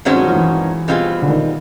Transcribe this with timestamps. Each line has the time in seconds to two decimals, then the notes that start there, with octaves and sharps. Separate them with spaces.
0.05 G2 D#3 G#3 C4 C#4 F#4
0.16 F#3
0.26 F3
0.36 E3
0.88 B2 G3 C4 F4 G#4
1.22 D3
1.28 D#3